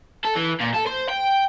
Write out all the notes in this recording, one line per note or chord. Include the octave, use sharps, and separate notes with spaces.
A4
E3
A#2
A4
C5
G5